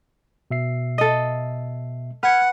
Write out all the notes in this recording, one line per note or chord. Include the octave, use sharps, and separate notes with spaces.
B2 E5 C7
A4 D#5
B4 F#5 F6 G#6